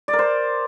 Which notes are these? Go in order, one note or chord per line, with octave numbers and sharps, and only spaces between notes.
D5
A#4
C5